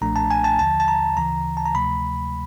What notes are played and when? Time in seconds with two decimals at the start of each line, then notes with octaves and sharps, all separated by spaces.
0.01 B1 A#2 F3 A3 D4 A#5
0.16 A5
0.31 G#5
0.44 A5
0.59 D#2 D3 F3 A5
0.80 A5
0.88 A#5
1.17 D2 C#3 E3 A#5
1.57 A5
1.66 A#5
1.74 D2 C3 F3 A3 B5